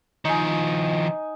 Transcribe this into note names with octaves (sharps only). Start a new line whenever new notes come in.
D#3 F3 D#4 G#5